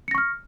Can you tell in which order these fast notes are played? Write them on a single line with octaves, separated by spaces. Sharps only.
C#7 A#6 C#6 F6